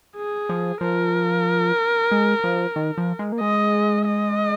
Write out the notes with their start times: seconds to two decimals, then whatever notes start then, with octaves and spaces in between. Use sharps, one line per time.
0.17 G#4
0.49 F3
0.81 F3 A#4
2.11 G#3
2.44 F3
2.76 D#3
2.98 F3
3.19 G#3
3.32 A#3
3.41 G#3 D#5
4.06 D#5